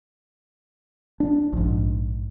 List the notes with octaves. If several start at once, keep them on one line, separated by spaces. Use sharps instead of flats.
D4
A#1 G#2